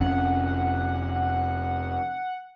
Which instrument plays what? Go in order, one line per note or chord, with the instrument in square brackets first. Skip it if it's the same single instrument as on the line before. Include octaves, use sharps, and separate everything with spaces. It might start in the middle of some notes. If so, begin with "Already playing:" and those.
[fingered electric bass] F1 F2 C#4 [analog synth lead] F#5